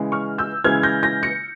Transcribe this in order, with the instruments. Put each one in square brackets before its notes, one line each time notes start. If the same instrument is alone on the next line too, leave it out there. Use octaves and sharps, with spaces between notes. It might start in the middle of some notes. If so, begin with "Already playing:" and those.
Already playing: [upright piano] C#3 E3 G#3
[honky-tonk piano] C#6 F6
E6 G6
[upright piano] C#3 E3 G#3 [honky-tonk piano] F6 G#6
[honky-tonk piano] G6 A#6
G6 A#6
A#6 C#7